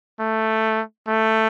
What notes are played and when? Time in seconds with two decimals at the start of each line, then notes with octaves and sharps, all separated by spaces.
0.20 A3
1.08 A3